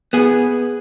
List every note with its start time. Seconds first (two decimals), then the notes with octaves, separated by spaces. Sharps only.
0.13 B3 G#4